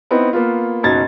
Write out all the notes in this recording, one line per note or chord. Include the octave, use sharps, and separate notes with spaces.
B3 C4 D#4 E4
A#3 B3 F4
F#1 B2 D#4 G#6 A6